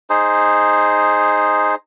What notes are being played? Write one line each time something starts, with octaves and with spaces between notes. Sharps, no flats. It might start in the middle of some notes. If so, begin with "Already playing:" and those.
D#4 G#4 C5